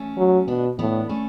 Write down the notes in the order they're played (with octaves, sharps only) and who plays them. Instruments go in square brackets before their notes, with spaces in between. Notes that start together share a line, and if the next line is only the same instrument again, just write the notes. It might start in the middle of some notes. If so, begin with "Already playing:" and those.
Already playing: [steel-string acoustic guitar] A3 C#4
[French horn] F#3
[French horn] B2 [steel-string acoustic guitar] B3 D4
[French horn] A2 [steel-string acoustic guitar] B3 D4
[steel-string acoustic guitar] A3 C#4